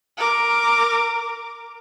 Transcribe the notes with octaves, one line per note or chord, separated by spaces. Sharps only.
A#4 D6